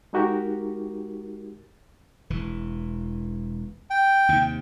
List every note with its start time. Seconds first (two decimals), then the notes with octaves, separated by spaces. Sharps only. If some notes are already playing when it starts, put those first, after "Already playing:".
0.13 G#3 D#4 F#4 G4 A#4
2.30 E1 E3
3.90 G5
4.29 D#2 C3